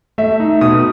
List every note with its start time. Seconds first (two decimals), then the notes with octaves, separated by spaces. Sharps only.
0.18 A3 E5
0.40 D#4
0.61 B2 D#6